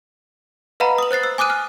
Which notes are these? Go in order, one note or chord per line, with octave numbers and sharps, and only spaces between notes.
B4 D#5 F5 F#5 A#5 B5
D#6 F#7
C5 F#6 A6 C7
E6
G#5 D6 D#6 F#6 D#7
F6